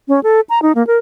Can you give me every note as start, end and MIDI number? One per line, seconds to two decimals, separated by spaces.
0.08 0.20 61
0.23 0.41 69
0.50 0.62 82
0.62 0.72 63
0.75 0.85 58
0.87 0.98 70